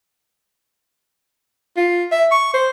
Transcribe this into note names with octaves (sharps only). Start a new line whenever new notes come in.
F4
E5
C#6
C5